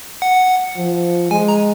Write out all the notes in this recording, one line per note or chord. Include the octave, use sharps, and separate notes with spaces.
F#5
F3
G#3 G#5
A#5